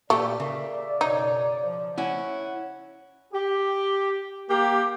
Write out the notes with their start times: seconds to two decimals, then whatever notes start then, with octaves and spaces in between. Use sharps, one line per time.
0.10 A#2 A3 G4 D5
0.40 C#3 A#4 E5
1.01 F#2 B2 D#4 C#5
1.63 F3
1.98 C#4 E4 F#5
3.33 G4
4.50 A#3 G4